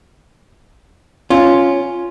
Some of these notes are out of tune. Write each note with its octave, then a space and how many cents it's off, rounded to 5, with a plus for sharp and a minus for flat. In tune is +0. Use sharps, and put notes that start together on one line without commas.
C#4 +0 F4 +0